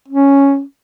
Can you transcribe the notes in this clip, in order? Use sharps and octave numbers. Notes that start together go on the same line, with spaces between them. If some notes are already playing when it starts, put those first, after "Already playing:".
C#4